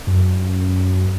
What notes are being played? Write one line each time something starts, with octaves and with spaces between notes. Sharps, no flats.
F#2